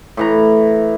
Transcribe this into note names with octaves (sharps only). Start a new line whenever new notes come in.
A2 E3 A#5